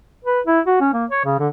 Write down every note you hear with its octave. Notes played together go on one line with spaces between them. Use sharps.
B4
E4
F#4
C#4
A#3
C#5
C#3
D3